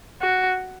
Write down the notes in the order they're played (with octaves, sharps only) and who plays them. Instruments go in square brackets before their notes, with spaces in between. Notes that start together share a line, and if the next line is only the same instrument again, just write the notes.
[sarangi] F#4